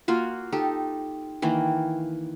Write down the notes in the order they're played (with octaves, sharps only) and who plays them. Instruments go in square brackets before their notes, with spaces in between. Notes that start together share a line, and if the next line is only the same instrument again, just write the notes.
[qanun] A#3 F4 F#4
D#4 G4 A4
D#3 E3 A#3